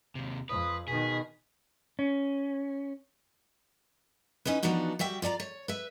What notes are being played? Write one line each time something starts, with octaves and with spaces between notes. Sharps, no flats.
D#2 C3
F2 B4 D#6
B2 D#3 G#4 B6
C#4
C#4 D#4 E4 B4
E3 F3 B3 D4 D#4 F#4
G3 F#4 E5 G5
F4 D5 A5 A#5
C#5
B4 E5